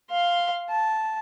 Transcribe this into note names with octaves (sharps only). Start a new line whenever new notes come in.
F5 C6
A5